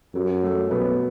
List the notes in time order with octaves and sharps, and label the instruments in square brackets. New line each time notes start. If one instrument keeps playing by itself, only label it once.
[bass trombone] F#2 [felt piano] F#3
[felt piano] A3
[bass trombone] B2 [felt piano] F#3 B3